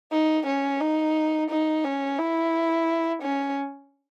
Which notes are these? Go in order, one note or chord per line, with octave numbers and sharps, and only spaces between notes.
D#4
C#4
D#4
D#4
C#4
E4
C#4